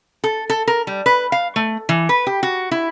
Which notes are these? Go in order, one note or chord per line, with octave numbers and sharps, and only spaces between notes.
A4
A4
A#4
G3
B4
F5
A3
E3
B4
G4
F#4
E4